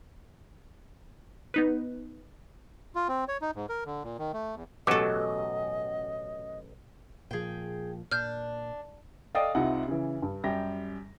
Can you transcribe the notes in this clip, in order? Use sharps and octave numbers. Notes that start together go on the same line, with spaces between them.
B3 D#4 B4
F4
C4
C#5
D#4
G#2
A#4
D3
A#2
D#3
A3
E2
A1 F#2 B2 F#3 G4 A4 D#5 D6
A#2 F3 G#4 G5
A#2 D4 F6 G6
A4 D5 D#5 F5 G5 D#6
C2 C3 D#4 F4 F#5
C#3 E3
G2
F#2 G3 G4 A#6